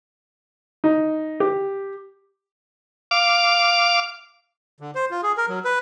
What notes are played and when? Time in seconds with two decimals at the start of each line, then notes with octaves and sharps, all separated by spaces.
0.84 D#4
1.40 G4
3.11 F5 D6
4.80 D3
4.95 C5
5.11 F4
5.23 G#4
5.38 A#4
5.49 F#3
5.65 B4